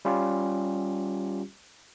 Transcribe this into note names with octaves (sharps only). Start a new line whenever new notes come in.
G3 C#4 F4 G4